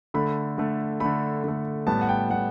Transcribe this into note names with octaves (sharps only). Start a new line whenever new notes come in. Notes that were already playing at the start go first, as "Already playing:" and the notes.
D3 A3 B5
D3 A3
D3 A3 B5
D3 A3
A2 G3 B3 A5
F#5
G5
A2 G3 B3 F#5